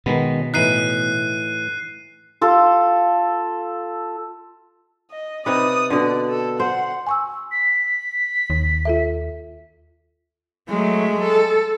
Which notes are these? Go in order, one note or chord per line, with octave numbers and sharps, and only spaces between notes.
B2 D#3 G#3 B3
A2 E3 D#4 F#6 C7 D#7
F4 A4
D#5
C3 D#4 B4 D5 D#6
B2 D3 D5
A4
C5 F#5
G#5 C#6 E6
B6
D#2
F4 A4 E5
F#3 G#3 A3
A4